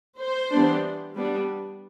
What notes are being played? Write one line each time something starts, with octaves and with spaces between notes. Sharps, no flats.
C5
E3 G3 B3 D4
G3 B3 D4